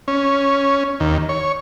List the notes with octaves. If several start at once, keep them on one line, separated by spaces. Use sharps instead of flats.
C#4
D#2
C#5